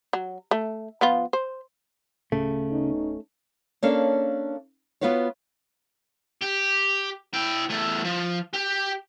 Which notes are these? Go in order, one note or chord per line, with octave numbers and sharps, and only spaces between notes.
F#3
A3
F3 B3 F4
C5
D1 C#3 A3
B3 C#4 D#4
A#3 C#4 D4 A4 C#5 F5
B3 F4 F#4 B4 C#5
G4
E4 G5
E2 A3
F3
G4